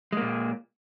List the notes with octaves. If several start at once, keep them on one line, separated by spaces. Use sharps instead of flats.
A#2 G#3 A#3